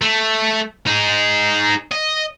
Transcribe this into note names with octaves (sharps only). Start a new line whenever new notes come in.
A3
D#4 G#4
D#5